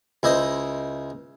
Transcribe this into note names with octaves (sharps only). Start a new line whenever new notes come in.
C#2 E4 C5 D#5